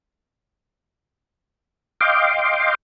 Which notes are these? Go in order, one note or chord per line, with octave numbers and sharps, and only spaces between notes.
D#5 F5 G5 C6 D6